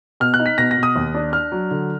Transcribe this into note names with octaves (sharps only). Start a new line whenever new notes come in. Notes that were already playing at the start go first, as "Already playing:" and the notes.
B2 F6
F#6
D#4
B6
B2 A#6
A#6
B2
D#6
D#2
D4
D4 F6
F#3
D3